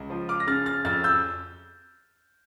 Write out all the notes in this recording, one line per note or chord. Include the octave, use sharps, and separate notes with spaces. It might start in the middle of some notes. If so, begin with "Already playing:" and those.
Already playing: C#2
F3
D6 F6
A#6
C#3 F6 A6
F6 A6
F2 F6 A6
E6 G6